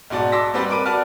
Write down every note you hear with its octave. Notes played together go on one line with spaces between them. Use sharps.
B1 G#2 F#4 D5 A5
A5 C6 D6 E6 A#6 B6
G3 C4 G4 B4 D5
A#4 B4 D6 D7 D#7
F#4 D5 A5 F6